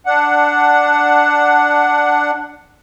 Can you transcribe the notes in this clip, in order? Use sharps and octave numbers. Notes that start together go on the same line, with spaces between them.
D4 F#5